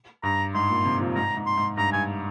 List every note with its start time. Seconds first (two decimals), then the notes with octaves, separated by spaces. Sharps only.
0.23 G2 A#5
0.55 G#2 C6
0.70 A#2
0.85 C3
1.01 F3
1.16 G#2 A#5
1.37 G#2
1.47 C6
1.57 G#2
1.77 G2 A#5
1.93 G2 G#5